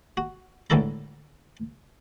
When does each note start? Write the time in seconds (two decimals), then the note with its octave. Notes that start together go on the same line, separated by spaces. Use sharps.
0.17 F#4
0.70 C#2 A2 D3 E4 A4 A#5